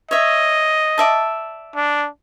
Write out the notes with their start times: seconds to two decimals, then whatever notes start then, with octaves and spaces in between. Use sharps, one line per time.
0.11 C#5 D#5 E5
0.98 D5 E5 A5
1.75 D4